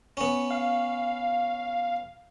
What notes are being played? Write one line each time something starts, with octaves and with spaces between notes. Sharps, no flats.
B3 C#4
F5